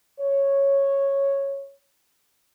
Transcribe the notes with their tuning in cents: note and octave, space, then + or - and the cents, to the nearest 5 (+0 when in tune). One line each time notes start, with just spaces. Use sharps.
C#5 -5